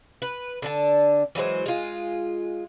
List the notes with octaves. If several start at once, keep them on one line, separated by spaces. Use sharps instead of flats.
B4
D3 D4 A5
E3 F#3 G#3 C5
G#3 F4